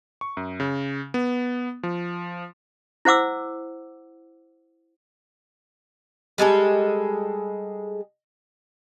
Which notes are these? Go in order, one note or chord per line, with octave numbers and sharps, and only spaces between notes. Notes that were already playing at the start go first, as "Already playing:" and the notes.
C#6
F#2
C#3
B3
F3
E4 C5 F#5 D6 E6
G3 G#3 G#4 A4